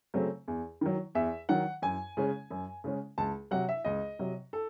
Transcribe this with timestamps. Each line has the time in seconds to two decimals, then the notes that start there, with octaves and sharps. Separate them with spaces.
0.14 C#3 F#3 A3 C4
0.48 E2
0.81 D#3 F#3
1.15 E2 E5
1.49 D#3 F#3 F#5
1.82 F#2 G#5
2.17 C#3 G#3 C#4
2.51 F#2
2.84 C#3 G#3 C#4
3.18 C#2 A5
3.51 C3 F#3 F#5
3.69 E5
3.85 C#2 D#5
4.19 C3 F#3
4.53 A4